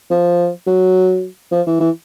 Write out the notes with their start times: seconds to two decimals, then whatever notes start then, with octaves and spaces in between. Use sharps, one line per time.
0.10 F3
0.67 F#3
1.51 F3
1.66 E3
1.80 E3